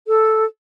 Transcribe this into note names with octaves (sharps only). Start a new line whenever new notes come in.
A4